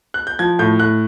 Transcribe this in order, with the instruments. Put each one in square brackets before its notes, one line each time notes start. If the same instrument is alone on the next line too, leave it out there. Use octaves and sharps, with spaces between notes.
[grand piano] F#6
G6
F3 G#6
A2 G6
A2 F#6